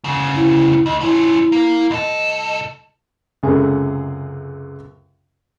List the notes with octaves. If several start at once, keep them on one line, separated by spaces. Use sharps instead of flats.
D2 C#3
E4
D2 D#5
F3 C#4 E4
A#3
C2 A4 D#5
C#2 F#2 C3 G#4 A4